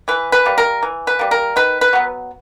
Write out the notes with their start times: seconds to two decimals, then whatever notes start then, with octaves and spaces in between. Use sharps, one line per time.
0.08 E3 B4
0.32 B4
0.45 G3 A#3
0.58 A#4
0.83 E3
1.07 B4
1.19 G3 A#3
1.31 A#4
1.56 D#3 B4
1.81 B4
1.93 F#3 B3